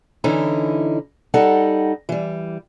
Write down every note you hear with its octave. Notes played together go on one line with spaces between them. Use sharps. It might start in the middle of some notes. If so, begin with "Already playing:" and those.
D3 E3 C#4 D#4 E4
G3 D#4 A4 F#5
E3 G3